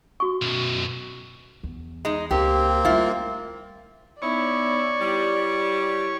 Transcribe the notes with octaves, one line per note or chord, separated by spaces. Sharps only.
F#4 C#6
B1 F#2
E2
G#3 D#4
C#2 A#3 C4 G4
G3 A3 E4 F4
B3 C#4 D#4 E4 C#5 D5 B5
G3 E4